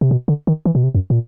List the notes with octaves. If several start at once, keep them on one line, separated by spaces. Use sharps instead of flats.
C3
B2
D3
D#3
E3
B2
C3
F#2
A#2